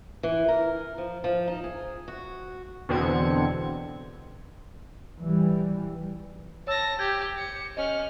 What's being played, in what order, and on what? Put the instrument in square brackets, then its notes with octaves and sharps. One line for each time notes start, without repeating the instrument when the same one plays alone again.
[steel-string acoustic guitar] E3
A#4
F3
F3
D#4
G#4
F#4
[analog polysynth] E2 B2 D3 C4 G#6 C#7
[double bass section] E3 G3
[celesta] C#5 E6 [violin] A5 A#6
[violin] G4 [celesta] G6 G#6
[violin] C#7
[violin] C#4 F6 [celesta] D#5